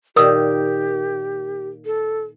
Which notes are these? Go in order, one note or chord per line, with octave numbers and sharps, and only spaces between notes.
A#2 D#3 G4 A#4 D#6
A4